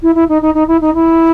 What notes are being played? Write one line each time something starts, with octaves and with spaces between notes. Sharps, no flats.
E4
E4
D#4
D#4
D#4
E4
D#4
E4